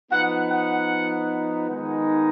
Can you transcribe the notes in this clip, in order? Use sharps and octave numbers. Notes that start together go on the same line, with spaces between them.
F3 B3 D#4 F#5
F#5
D#3 G#3 B3 D#4